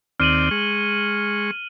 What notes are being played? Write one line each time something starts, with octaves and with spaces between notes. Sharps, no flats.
D#2 C4 D5 F6 D#7 F#7
G#3 C#6